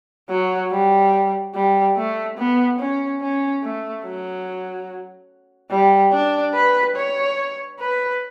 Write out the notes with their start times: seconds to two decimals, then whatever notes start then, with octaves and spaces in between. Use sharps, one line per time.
0.30 F#3
0.71 G3
1.54 G3
1.97 A3
2.38 B3
2.79 C#4
3.21 C#4
3.63 A3
4.05 F#3
5.70 G3
6.12 D4
6.54 B4
6.96 C#5
7.80 B4